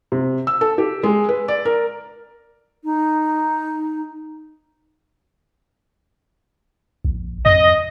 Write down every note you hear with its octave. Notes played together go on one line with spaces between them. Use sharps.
C3
E6
A4
G4
G#3
B4
D5
A#4
D#4
A#1
F2 D#5